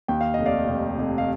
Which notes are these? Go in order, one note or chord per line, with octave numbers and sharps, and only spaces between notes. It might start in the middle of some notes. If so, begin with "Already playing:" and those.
D#2 G5
F5
D#5
F1
D5 F5
F1
F1
F5